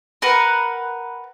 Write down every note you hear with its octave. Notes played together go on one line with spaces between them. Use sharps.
A#4 B4 F#5